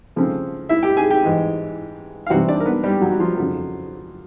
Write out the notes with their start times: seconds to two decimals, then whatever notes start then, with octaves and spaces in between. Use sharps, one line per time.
0.16 C#3 F3 A3 C4
0.69 E4 E5
0.83 G4 G5
0.97 G#4 G#5
1.11 G4 G5
1.24 G#2 E3 G#3
2.26 F5
2.30 C3 E3 G3 C4 F#4 F#5
2.48 D4 D5
2.60 A#4
2.66 B3 B4
2.83 G3 G4
3.01 F#3 F#4
3.12 F#4
3.19 F3 F4
3.38 F2 C#3 F#3